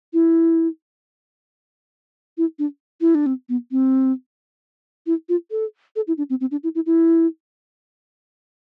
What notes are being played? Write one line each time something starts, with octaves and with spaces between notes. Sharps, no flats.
E4
E4
D4
E4
D4
C4
B3
C4
E4
F4
A4
A4
E4
D4
C4
C4
D4
E4
E4
E4